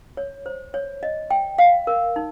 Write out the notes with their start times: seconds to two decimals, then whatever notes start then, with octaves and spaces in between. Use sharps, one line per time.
0.17 C#5
0.46 C5
0.74 C#5
1.03 D#5
1.30 G5
1.58 F5
1.87 A#4
2.16 D#4